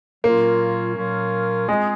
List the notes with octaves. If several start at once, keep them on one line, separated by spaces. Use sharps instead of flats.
A#2 F#3 A#3 C#4 F4 A#4
A#2 F#3 C#4 F4 A#4
G#3 C4 F4 G#4 D#5